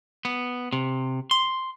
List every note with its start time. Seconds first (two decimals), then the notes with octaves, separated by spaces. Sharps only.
0.25 B3
0.73 C3
1.31 C6